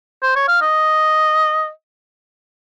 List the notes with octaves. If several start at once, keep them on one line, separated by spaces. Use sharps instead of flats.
C5
C#5
F5
D#5